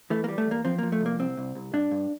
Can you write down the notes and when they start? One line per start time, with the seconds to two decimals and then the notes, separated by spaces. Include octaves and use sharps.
0.10 E3 A3
0.24 A#3
0.29 G3
0.38 A3
0.47 E2 A#3
0.65 F3 C4
0.78 A#3
0.83 F3
0.92 A3
1.01 C2 A#3
1.19 C2 C4
1.37 C2
1.55 C2
1.73 G2 D4
1.91 G2